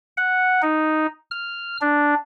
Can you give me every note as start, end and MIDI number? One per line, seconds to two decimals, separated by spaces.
0.17 0.62 78
0.62 1.07 63
1.31 1.77 89
1.81 2.14 62